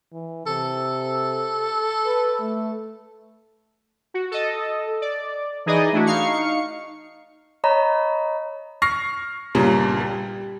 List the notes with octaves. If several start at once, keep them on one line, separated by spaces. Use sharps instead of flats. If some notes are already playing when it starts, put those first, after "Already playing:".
E3
C3 A4
B4
A3
F#4
A4 D#5
D5
E3 D#4 G#4 D5 D#5
A3 D4 E4 F#4
D#4 F5 C#6 C#7
C#5 D#5 A#5 B5
C#6 F6 A#6 C7
G1 A#2 C#3 G3 A#3
G3